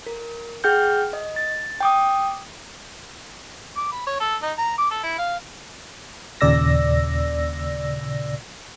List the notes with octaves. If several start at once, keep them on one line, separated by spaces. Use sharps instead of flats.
A#4
G#4 F#5 G5 F6 G6
D#5
A6
G5 D6 D#6
D6
B5
C#5
A4
D#4
A#5
D6
A4
E4
F5
D#2 A#2 C#3 D5 E6 A#6